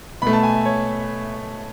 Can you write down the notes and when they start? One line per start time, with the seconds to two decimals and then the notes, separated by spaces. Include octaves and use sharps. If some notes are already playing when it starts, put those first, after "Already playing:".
0.22 B2 A3 B5
0.33 A5
0.43 G#5
0.55 E5
0.66 C#5